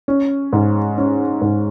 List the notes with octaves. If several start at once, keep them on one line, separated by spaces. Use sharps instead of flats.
C#4
G#2
C#4
G#2